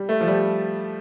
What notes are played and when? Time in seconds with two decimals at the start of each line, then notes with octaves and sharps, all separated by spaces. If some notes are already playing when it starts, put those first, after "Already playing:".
Already playing: G3
0.09 A3
0.21 F3
0.27 G3